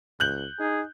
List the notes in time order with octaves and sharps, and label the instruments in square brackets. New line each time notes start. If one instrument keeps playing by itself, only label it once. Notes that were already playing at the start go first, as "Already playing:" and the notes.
[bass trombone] C#2 [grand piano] F#6 G6 F#7
[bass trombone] D#4 [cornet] G#4